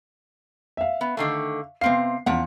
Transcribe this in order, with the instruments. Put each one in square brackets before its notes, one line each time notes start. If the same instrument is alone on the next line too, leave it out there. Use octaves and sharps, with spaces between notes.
[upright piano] E5 F5
[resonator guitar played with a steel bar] B3
D3 D#3 A3
[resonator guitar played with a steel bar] C3 C4 F5 [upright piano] B3 C7
[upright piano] E2 [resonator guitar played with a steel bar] F3 C#4 F#5